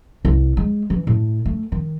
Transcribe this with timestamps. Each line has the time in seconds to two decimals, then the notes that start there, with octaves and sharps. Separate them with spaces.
0.25 C2
0.57 G#3
0.90 E3
1.07 A2
1.45 A3
1.72 D#3